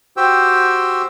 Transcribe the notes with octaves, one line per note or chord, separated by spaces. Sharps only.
F#4 G4 C5 G5 E6